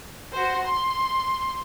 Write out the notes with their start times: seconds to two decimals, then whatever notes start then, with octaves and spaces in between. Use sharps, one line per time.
0.32 F#4 C5
0.65 C6